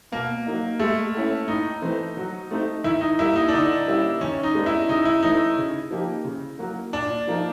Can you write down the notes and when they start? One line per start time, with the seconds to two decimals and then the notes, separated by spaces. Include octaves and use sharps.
0.12 B2 A#3
0.46 F#3 A#3 D#4
0.79 G#3 A3
1.14 C#4 E4 A4
1.48 A2 D#4
1.82 E3 A3 C4
2.17 F#3
2.51 A3 C4 D#4
2.84 D#3 E4
3.01 D#4
3.19 G3 A#3 E4
3.36 D#4
3.48 D4
3.53 D3 D#4
3.87 G3 A#3 C#4 E4
4.21 D#3 C#4
4.43 D#4
4.55 G#3 B3 D4
4.66 E4
4.89 C#3 D#4
5.05 E4
5.23 E3 A3 C#4 D#4
5.57 C#3
5.91 F3 A#3 D#4 G4
6.24 C#3
6.59 F#3 A#3
6.93 A#2 D4
7.27 F3 A#3 D#4